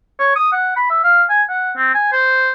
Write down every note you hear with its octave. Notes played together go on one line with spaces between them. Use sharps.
C#5
D#6
F#5
B5
E5
F5
G#5
F#5
C4
G#5
C5